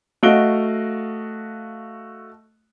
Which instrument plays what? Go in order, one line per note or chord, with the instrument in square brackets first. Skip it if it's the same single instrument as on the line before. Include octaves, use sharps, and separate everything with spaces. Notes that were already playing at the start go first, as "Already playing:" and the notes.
[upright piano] A3 F#4 D#5 F5 D7 G7